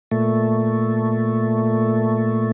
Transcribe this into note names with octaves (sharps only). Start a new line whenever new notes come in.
A#2 A3